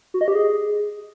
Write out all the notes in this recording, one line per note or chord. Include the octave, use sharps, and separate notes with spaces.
F#4
D#5
G4
G#4